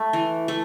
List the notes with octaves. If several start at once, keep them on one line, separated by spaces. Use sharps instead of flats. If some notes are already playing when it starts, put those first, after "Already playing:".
Already playing: A3
E3
A3